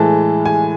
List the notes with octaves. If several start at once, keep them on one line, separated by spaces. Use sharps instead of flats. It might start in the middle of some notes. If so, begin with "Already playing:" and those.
Already playing: A2 E3 G#3 A5
G#5